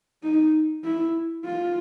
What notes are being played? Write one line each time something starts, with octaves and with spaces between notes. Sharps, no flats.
D#4
E4
F4